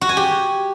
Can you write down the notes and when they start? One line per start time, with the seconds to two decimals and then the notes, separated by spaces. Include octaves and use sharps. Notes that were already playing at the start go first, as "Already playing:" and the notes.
0.01 F#4
0.09 G#5
0.17 G4